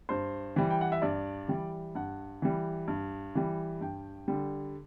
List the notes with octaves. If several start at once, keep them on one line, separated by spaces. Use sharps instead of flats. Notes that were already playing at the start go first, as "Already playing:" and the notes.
G2 C5
E3 G3
G5
F#5
E5
G2 D5
E3 G3
G2 F#5
E3 G3
G2
E3 G3
G2 G5
D3 G3